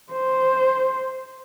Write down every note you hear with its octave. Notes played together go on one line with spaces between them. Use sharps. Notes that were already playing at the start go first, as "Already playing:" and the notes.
C5